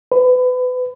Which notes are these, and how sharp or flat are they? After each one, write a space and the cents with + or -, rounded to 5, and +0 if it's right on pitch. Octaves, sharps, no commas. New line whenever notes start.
B4 +30